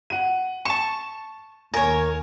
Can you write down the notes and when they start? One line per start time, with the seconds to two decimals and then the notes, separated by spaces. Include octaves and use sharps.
0.10 F#5 D#7
0.65 A5 C#6 E7
1.74 D#2 A#4 C#5 G#5